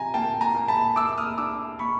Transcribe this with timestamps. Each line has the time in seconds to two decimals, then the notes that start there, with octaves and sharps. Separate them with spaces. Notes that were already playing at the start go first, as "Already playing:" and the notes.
Already playing: C3 F3 G#5 A#5
0.14 A#3 G5 A5
0.41 G#5 A#5
0.55 A#3
0.68 A5 B5
0.96 A#3 D6 E6
1.18 D#6 F6
1.38 D4 D6 E6
1.79 A#3 B5 C#6